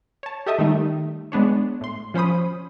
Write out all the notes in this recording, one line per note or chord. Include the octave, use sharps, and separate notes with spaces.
C#5 A5
G4 A4 D#5 E5 A5 D#6
D#3 G3 A3 D#4
G#3 B3 D4 C#5
A2 C6
F3 C#4 C5 B5 D#6